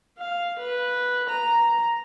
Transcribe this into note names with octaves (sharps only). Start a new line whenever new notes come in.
F5
B4
A#5